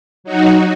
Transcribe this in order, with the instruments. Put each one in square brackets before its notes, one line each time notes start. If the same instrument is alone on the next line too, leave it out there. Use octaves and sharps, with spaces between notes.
[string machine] F#3 D#4 F#4